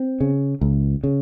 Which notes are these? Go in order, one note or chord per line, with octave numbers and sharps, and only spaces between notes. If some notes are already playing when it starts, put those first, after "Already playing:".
Already playing: C4
C#3
C#2
C#3